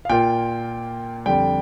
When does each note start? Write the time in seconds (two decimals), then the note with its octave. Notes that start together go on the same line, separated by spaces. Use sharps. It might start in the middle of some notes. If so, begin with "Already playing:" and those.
0.05 F5
0.09 A#2 A#3 F4 G5
1.26 F2 D3 G3 G5